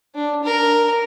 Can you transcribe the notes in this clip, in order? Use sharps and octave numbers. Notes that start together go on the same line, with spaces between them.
D4
A#4